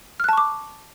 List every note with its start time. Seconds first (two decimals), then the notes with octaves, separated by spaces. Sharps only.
0.20 F6
0.24 F#6
0.29 A5
0.33 C#6
0.38 D6